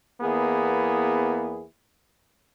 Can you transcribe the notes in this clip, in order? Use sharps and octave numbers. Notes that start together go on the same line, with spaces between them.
E2 A#3 B3 E4 G#4